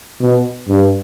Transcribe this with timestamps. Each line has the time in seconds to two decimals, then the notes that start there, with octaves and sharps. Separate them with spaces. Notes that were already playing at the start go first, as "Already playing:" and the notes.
0.20 B2
0.68 G2